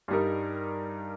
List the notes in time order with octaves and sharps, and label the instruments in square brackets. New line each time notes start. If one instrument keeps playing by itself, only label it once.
[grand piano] G2 G3 D#4 A#4